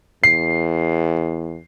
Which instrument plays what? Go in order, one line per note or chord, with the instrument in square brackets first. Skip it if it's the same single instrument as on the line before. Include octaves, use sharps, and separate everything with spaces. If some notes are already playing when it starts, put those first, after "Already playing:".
[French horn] E2 [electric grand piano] C7